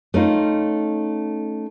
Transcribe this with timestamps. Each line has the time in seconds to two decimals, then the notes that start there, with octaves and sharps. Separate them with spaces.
0.14 A3 C#4 D#4 F4